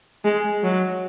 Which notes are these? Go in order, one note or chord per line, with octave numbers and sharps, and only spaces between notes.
G#3
F#3